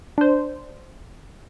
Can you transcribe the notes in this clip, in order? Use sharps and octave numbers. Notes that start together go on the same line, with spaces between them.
D4 C5